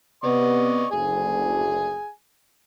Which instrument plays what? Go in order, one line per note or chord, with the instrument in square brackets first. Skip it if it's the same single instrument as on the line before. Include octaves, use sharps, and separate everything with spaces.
[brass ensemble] C3 B3 [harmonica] D5 D#5 C#6
[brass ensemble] F#1 D2 [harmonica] G#4 G#5